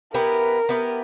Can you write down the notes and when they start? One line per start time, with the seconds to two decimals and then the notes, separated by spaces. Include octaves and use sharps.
0.13 B3 E4 G4 A#4 B4
0.69 B3 E4 G4 B4